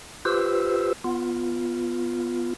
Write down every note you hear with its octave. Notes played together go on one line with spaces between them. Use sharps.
F4 G4 B4 C5 E6
B3 F4